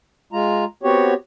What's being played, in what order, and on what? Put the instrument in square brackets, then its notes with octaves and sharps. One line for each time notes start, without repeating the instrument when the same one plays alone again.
[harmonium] G#3 F4 A#5
B3 C4 F#4 G4 C#5